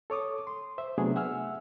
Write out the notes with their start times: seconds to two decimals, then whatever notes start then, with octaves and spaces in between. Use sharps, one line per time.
0.10 A4 C#5 D6 D#6
0.47 C6
0.78 C5 E5
0.98 C3 F#3 A3 B3 D4 G#4
1.15 E5 F#5 G#5 E6 F6